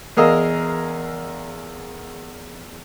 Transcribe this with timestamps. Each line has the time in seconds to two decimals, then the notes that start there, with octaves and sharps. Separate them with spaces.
0.17 E2 G#4 A#4 D#5 F5 E6